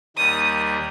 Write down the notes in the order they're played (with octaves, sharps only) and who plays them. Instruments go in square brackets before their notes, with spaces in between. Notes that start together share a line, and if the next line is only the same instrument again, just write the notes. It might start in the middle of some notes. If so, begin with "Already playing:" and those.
[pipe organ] D#2 D#3 G3 [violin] D#6